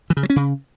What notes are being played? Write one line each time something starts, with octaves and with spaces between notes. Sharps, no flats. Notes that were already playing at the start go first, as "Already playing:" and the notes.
E3
C#3
F#3
C#4
C#3